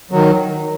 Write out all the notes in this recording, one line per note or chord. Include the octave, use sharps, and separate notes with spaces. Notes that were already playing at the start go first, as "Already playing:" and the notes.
D#3 F#3